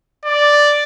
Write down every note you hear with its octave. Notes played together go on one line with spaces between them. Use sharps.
D5